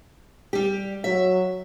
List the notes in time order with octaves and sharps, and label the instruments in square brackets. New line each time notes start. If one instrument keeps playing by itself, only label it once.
[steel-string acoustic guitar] G3 G4
[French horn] F#3 [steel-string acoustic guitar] E5